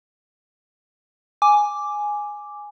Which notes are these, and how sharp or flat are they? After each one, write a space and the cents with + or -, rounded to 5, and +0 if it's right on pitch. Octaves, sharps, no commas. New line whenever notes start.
G#5 +0 D6 +0